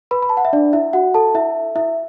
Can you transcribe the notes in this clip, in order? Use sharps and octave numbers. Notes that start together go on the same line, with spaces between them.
B4 B5
B5
A5
F#5
E5
D4 D5
E4 E5
F#4 F#5
A4 A5
E4 E5
E4 E5